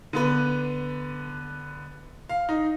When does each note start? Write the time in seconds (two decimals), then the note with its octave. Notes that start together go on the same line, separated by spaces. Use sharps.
0.13 D3 B3 B4
2.29 F5
2.49 D#4